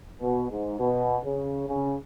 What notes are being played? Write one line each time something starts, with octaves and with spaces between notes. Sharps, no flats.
B2
G#2
B2
C#3
C#3